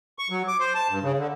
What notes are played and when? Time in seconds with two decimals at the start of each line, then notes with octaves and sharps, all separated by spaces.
0.19 C#6
0.30 F#3
0.48 D6
0.59 C5
0.75 A5
0.89 G2
1.03 C#3
1.18 D3